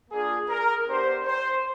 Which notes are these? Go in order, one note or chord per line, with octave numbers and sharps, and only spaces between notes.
A#3 D4 F4 G#4
A#4
B3 D4 G4 C5
C5